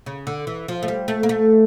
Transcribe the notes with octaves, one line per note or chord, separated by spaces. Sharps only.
C#3
D3
E3
F3
A3
G3
A3
A#3
A3